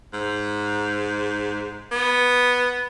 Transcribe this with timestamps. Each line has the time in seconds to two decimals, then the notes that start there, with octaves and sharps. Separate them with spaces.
0.13 G#2
1.92 B3